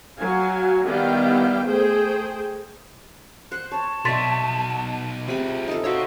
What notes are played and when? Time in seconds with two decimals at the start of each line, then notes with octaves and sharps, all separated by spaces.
0.18 F#3 F5 G#5
0.86 D#3 G3 B3 E4 F5 G5
1.68 A3 G#4 C5 G5
3.52 C5 F#6
3.72 C#5 A5
4.05 B2 D#4 C#5 D5 E5 C6 A6 B6
5.28 C3 F4 G#4 B5
5.68 D#4 A4
5.84 F#4 C5 C#5 F5 G5 E6